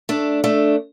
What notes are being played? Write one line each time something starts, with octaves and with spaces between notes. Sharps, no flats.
A3 D4
A3 D4